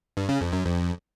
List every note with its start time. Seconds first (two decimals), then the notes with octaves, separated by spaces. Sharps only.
0.17 G2
0.29 C#3
0.41 F2
0.53 F#2
0.65 F2